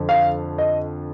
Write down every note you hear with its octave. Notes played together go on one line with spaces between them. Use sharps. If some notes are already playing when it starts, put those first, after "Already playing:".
Already playing: F2 D3
F5
D#5